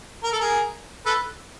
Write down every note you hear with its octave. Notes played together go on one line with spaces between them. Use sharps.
A#4
A4
G#4 A#4
A4 B4